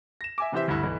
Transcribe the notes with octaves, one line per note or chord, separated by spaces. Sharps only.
A#6 E7
E5 G#5 D6
C3 E3 C4 G4 C5 E5
D2 G2 D3 E4
B1 E3 E4